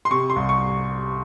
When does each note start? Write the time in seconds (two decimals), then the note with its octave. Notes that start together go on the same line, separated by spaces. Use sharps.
0.05 C6
0.10 C3 C#6
0.30 C6
0.36 C2
0.49 C#6